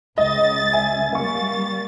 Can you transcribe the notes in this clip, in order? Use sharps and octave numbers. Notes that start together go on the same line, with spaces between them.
C#2 D#5 A6
E5 G#5
G3 A#3 C#6 A6